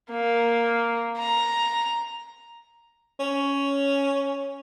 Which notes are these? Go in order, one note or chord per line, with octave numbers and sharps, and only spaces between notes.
A#3
A#5
C#4